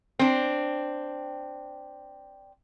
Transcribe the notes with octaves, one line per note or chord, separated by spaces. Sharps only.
C4 D4